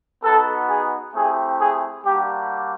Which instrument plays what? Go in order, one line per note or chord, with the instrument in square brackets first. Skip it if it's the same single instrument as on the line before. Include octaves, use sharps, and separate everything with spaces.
[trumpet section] B3 D#4 F#4 A4
G#4
A3 C4 E4 G4 G#4
G#4
G3 A#3 D4 F#4 G4